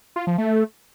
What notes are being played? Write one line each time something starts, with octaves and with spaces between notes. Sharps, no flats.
F4
F3
A3